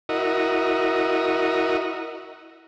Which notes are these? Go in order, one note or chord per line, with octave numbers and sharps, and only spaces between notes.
E4 F#4 A#4 D#5